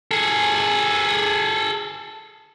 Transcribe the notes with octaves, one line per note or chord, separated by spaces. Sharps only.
G#4 A4